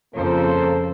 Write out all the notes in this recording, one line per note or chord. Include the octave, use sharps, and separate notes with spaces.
F2 C#3 F3 A#3 A4 C5